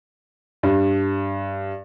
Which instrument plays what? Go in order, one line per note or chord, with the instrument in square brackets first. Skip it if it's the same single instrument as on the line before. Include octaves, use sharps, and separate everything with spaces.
[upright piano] G2